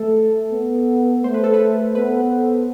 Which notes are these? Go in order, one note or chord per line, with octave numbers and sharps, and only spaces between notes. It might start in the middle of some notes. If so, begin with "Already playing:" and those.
Already playing: A3 A4
B3
A3 C5
B4
A4
B4
B3 B4